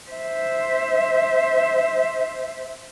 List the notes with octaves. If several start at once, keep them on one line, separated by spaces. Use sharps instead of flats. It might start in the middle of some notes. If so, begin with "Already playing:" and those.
C5 E5